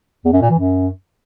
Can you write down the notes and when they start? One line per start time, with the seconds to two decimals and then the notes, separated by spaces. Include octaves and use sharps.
0.25 E2
0.33 F#2
0.42 A#2
0.50 E3
0.58 F#2